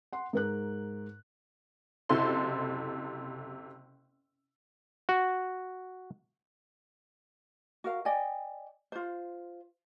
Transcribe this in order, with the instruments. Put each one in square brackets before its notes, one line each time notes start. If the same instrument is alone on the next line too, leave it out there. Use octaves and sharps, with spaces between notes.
[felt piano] F#5 C6
G#2 A#4 F#6
[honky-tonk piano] F#1 C3 E4 A4 C6
[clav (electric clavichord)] F#4
[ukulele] F#4 A#4 F5
D5 D#5 G5 G#5
F4 C5